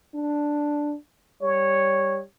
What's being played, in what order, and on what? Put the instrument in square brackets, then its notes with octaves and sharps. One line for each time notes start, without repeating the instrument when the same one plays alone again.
[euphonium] D4
[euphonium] G3 [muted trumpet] C#5